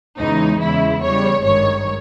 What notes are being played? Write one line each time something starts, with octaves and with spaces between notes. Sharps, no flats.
E2 C#3 E3 G#3 D#4
E2 C#3 G#3 E4
E2 C#3 G3 C#5
G#1 G2 D#3 G#3 C#5